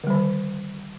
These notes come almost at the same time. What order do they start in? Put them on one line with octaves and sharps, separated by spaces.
D3 G3 D#3